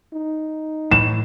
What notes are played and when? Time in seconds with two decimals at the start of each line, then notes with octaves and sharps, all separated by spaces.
0.13 D#4
0.92 A2 E3 E7